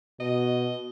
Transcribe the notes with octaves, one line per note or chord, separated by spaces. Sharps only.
B2 D#5